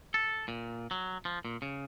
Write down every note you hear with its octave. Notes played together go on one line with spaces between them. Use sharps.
A4
A#2
F#3
F3
A#2
C#3